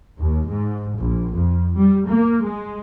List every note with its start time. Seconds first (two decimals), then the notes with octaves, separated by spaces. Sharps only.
0.18 D#2
0.48 G#2
0.98 A#1
1.37 F2
1.77 G3
2.07 A#3
2.42 G#3